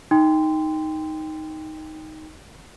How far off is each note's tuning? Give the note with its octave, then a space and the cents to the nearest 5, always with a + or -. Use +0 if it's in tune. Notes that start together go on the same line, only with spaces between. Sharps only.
D#4 +5 G5 +15 C6 -20